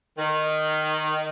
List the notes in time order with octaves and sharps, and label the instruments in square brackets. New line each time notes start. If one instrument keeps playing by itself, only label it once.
[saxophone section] D#3